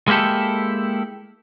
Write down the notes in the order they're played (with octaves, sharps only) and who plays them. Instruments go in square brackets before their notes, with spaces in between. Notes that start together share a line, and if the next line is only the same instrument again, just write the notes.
[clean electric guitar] G#3 A#3 E4 G4 A4